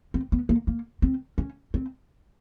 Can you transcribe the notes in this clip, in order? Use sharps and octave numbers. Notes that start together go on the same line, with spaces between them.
C4
B3
A#3
A#3
C4
C#4
C4